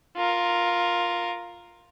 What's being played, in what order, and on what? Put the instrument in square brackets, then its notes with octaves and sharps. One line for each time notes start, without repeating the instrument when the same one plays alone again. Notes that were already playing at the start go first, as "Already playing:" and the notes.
[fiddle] F4 A#4